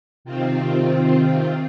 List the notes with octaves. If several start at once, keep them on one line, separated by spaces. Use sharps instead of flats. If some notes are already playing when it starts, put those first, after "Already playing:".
C3 D#3 C4 F4